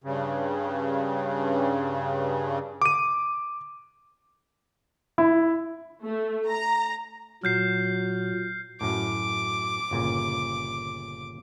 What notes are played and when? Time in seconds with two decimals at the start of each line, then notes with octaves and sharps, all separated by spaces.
0.04 G2 C#3
2.82 D6 D#7
5.18 E4
6.03 A3
6.49 A#5
7.44 A#2 F#3 F6 G6 C7
8.81 F#2 A2 D6
9.91 G1 A#2 C#3